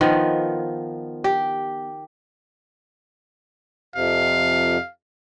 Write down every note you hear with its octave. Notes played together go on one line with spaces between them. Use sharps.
D#3 F3 B3
G4
F2 C3 F5